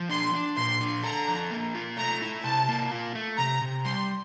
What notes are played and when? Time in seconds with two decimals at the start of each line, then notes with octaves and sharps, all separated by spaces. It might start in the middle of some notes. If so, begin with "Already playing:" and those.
Already playing: F3
0.09 D4 C6
0.34 D4
0.57 A#2 C6
0.81 D4
1.03 A4 A#5
1.28 F3
1.51 A#3
1.75 F4
1.97 A3 A#5
2.22 E4
2.44 C3 A5
2.68 A#3
2.91 F4
3.15 A3
3.38 C3 A#5
3.61 C3
3.85 G3 C6